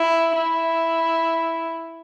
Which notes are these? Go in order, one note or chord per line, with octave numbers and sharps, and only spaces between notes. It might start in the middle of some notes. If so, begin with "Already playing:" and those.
Already playing: E4
E4